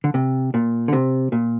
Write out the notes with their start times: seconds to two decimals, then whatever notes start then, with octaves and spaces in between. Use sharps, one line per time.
0.04 D3
0.14 C3
0.54 A#2
0.88 D3
0.93 C3
1.32 A#2